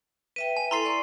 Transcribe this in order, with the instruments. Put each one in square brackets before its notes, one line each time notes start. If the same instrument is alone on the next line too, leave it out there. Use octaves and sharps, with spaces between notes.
[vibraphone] B4 E5 G5 [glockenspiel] D#7
[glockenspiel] G#5
[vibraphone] E4 A4 [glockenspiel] A#5 C6 C7
[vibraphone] D5 C#6